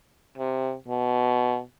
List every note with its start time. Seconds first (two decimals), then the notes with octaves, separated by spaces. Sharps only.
0.38 C3
0.88 B2